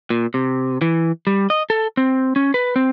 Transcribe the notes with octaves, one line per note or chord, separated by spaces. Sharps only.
A#2
C3
E3
G3
D#5
A4
C4
C#4
B4
C4